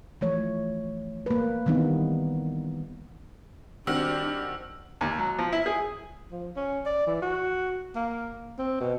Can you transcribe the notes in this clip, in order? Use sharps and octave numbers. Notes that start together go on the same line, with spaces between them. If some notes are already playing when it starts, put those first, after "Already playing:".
E3 F3 A3 C#5
A#3 B4
D#3 E3 G3 B3 C4 D#4
D#3 G3 C4 D4 F#4 E6
D#2
F#3
F3
E4
G#4
F3
C#4
D5
E3
F#4
A#3
C4
B2